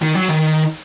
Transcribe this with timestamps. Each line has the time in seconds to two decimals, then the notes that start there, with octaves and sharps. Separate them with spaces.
0.02 D#3
0.15 F#3
0.28 D#3